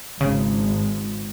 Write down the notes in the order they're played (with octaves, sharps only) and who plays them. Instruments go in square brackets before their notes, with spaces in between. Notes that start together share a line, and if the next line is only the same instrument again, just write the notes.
[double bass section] G#1 G#3 [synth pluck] C#3